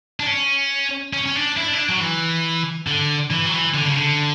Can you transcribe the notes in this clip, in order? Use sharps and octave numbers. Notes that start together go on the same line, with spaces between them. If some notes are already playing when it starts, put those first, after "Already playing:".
D4
C#4
C#4
C#4
D4
E4
D4
E4
D4
F#3
E3
D3
E3
F#3
E3
D3
C#3
D3